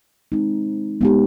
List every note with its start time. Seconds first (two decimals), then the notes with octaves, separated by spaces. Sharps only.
0.32 G#3 C4 D#4
1.01 G#3 B3 D#4 G4